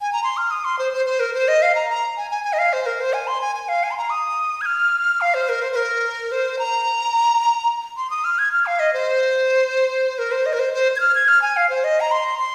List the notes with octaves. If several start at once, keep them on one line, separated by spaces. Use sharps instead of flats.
G#5
A#5
C6
F6
D#6
C6
C5
C5
C5
A#4
C5
D#5
F5
A#5
A#5
G#5
G#5
G#5
D#5
F5
C5
A#4
C5
G#5
C6
G#5
G#5
F5
G#5
C6
A#5
D#6
G#6
F6
F5
C5
A#4
C5
C5
A#4
C5
A#5
C6
D#6
F6
G#6
F6
F5
D#5
C5
A#4
C5
D#5
A#4
C5
C5
G#6
F6
G#6
F6
G#5
F5
C5
D#5
A#5
C6
C6